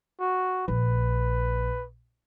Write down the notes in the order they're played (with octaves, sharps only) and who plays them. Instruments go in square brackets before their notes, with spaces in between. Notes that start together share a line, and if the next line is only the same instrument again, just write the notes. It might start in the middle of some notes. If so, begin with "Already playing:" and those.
[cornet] F#4
[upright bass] A#1 [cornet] B4